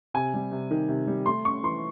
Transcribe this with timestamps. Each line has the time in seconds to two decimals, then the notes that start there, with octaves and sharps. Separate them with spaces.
0.14 C3 G#5
0.34 G3
0.52 C3
0.71 D#3
0.88 C3
1.07 G3
1.26 A3 C6
1.45 C#4 C#6
1.63 E3 C6